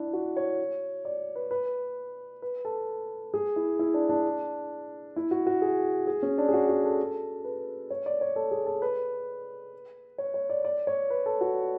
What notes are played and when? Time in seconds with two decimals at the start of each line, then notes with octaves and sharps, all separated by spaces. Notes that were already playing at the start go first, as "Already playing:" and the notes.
Already playing: D4 E4
0.13 F#4
0.37 C#5
1.05 D5
1.35 B4
1.51 B4
2.42 B4
2.65 A4
3.34 G#4
3.56 E4
3.79 E4
3.94 D4
4.09 D4
5.16 E4
5.31 F#4
5.47 F#4
5.62 G#4
6.07 G#4
6.22 C#4
6.38 D4
6.48 G#4
6.53 F#4
6.69 F#4
6.84 A4
7.45 B4
7.91 C#5
8.06 D5
8.21 C#5
8.36 A4
8.51 G#4
8.66 A4
8.82 B4
10.18 C#5
10.34 C#5
10.50 D5
10.65 D5
10.87 C#5
11.10 B4
11.26 A4
11.41 F#4